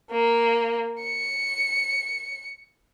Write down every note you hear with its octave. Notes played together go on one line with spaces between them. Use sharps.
A#3
C#7